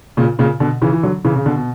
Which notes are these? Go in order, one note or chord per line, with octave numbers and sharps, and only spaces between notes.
A#2 C#3
A#2 C#3
B2 D3
C#3 E3
E3
D3 F#3
C#3 E3
C#3
B2 D3
B2